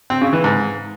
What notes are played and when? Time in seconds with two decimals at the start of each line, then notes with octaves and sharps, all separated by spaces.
0.10 C4
0.21 C#3
0.33 E3
0.44 G#2